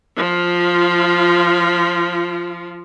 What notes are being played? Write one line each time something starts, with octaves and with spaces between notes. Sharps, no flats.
F3 F4